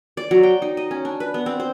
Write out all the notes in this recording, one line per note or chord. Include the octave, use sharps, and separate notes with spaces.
D5
F#3
G5
D#4
D#5
C#4
D4
B4
B3
C4
C5